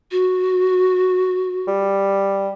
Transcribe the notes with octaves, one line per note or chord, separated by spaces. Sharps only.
F#4
G3